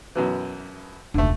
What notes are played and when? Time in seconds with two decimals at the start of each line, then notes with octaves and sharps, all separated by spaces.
0.15 F#2 B2 E3
1.14 E1 C#2 D3 A3